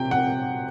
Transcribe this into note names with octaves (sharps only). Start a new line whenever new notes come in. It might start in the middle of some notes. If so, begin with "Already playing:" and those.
Already playing: C3 G5
C3 F#5